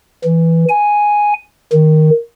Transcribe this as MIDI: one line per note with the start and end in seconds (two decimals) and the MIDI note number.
0.24 0.65 52
0.69 1.34 80
1.73 2.10 51